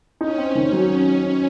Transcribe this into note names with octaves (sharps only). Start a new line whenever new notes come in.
C#4 D#4
C4
D#3
F#3